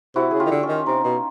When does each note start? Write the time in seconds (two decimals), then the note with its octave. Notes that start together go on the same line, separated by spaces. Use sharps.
0.16 C3 E4 F#4
0.31 C#3 G#4
0.40 F4 G4
0.46 D#3
0.51 D3
0.63 C#4
0.69 D#3
0.87 C3 D#4
1.04 B2